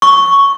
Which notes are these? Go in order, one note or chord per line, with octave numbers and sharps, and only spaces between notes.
C#6